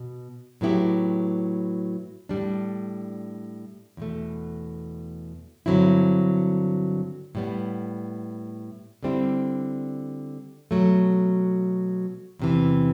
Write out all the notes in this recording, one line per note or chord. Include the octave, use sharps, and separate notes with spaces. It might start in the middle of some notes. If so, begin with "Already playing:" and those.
Already playing: B2
A2 F#3 B3 E4 G4
A2 G3 D4
E2 B2 A3
G2 D3 F#3 C4 E4
A2 G3 B3
D3 G3 C4 E4
B2 F#3 A3
E2 C3 E3